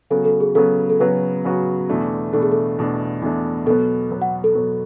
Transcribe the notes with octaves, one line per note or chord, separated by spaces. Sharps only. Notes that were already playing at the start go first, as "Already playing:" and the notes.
C#3 F#3 B3 F#4 A4
A4
G#4
C#3 F#3 B3 F#4 A4
A4
C#3 F#3 B3 F#4 B4
C#3 F#3 B3 F#4
E2 B2 A3 D4
E2 B2 A3 D4 A4
G#4
A4
E2 B2 A3 D4
E2 B2 A3 D4
B2 F#3 B3 A4
B2 F#3 B3
F#5
A4
B2 F#3 B3